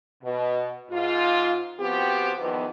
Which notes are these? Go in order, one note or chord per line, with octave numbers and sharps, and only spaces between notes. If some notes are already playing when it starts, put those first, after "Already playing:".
B2
G#2 F4
F3 B3 C4 F#4 G4
E2 D#3 F3 B3